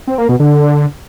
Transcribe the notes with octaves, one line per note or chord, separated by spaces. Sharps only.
C4
A#3
B2
D3